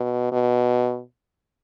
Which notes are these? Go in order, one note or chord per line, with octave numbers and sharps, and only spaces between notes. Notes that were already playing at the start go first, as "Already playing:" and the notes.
Already playing: B2
B2